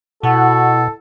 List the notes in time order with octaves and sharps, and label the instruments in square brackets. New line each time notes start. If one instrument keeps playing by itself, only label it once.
[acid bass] B2 [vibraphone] E4 F#5 [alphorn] F#4 [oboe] A4